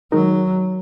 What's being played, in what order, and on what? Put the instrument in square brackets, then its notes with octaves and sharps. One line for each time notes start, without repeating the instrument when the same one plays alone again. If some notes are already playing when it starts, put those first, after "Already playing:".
[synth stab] D#3 G#3 D#4 A#4 [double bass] F#3